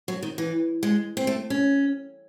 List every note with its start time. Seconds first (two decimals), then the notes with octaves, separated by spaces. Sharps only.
0.08 F#3
0.23 D#3
0.38 E3
0.83 G#3
1.17 C4
1.27 A3
1.50 C#4